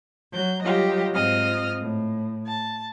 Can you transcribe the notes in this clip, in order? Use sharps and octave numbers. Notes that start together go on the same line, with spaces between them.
F#3 G6
F#3 G3 F4 G4 D#5
G#2 C4 F4 D#5 D#6 F6
A2
A5